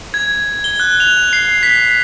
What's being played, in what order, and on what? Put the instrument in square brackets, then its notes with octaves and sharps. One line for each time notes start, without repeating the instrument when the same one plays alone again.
[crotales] G#6
G7
F#6
F7
C7
B6